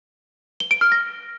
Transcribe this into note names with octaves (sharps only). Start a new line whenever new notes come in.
G7
D7
F6
A#6